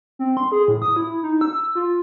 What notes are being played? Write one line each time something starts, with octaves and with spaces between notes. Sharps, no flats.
C4
C6
G#4
A2
D#6
E4
D#4
E6
F4